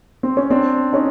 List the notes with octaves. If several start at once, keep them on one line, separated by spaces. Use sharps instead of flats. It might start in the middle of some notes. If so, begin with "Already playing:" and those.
C4
C#4
C4 D4
C#4 D#4